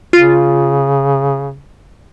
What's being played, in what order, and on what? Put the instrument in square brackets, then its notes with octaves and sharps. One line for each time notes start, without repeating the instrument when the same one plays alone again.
[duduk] C#3 [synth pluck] F4